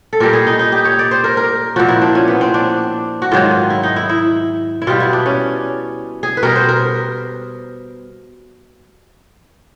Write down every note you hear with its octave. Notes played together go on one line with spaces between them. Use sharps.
A4
A#2 G3 A#4
G#4
D#4
D#4
G4
C#5
D5
C5
A#4
A#4
A#2 F3 F#4
E4
D4
C#4
B3
C4
D4
F#4
G#2 D#3 F#3 F4
E4
D#4
E4
E4
E4
B2 G3 F4
E4
D4
C#4
G#4
B4
B2 G3 A#4
C5
A#4